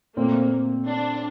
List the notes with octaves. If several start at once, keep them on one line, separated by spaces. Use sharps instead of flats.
A#2 A3 A#3 C4
D4